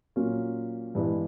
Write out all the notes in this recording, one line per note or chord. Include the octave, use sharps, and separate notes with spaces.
A#2 F#3 A#3 C#4
G2 E3 G#3 B3 E4